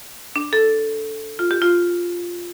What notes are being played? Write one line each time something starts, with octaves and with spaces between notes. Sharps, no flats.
D4
A4
F4
G4
F4